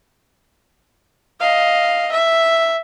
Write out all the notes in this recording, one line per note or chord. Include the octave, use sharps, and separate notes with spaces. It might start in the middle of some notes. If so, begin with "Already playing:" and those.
D#5 F5
E5